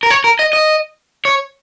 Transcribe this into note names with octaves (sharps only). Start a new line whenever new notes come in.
A#4
C#5
A#4
D#5
D#5
C#5